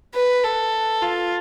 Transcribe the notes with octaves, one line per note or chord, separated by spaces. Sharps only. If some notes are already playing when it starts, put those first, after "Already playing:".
B4
A4
F4